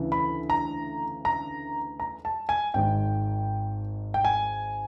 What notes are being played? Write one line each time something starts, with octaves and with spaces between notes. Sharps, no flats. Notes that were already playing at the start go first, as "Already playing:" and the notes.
Already playing: D2 C#3 E3
B5
A#5
A#5
A#5
A5
G#5
G#1 G#2 D#3 G#3 G5
G5
G#5